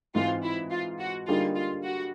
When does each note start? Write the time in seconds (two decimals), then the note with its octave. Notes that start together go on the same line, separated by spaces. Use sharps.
0.15 G#2 E3 G#3 C4 F4
0.43 E4
0.71 F4
1.00 F#4
1.27 D3 G3 A#3 D#4 F4 G#4
1.55 F4
1.84 F#4